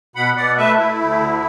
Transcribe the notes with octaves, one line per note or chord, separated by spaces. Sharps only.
B2 F#5 B5
B2 D5 F#5
A3 B4 E5
A3 E4
D2
D3